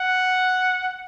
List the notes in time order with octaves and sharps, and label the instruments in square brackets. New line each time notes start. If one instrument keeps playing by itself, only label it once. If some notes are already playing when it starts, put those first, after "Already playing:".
Already playing: [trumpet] F#5